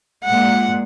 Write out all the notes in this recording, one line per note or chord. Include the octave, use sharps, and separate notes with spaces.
A#2 G#3 F#5